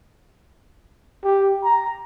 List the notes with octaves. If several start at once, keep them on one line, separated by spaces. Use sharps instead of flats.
G4
A#5